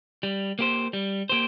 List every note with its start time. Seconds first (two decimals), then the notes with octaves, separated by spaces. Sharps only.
0.23 G3
0.59 A#3 G4 C5
0.93 G3
1.29 A#3 G4 C5